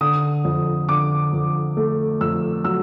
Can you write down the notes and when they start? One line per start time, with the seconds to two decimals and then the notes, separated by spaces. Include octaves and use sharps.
0.01 D3 D#6
0.45 F2
0.89 D3 D6
1.33 F2
1.77 A3
2.21 F2 E6
2.64 F#3 E6